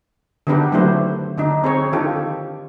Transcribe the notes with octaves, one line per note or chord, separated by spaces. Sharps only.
D3 D#3 B3 D4 G4 B4
D#3 F#3 A3 D4 E4 C5
D3 D4 D#4
C4 G#4 C#5
D#3 D4 F4 G4 A4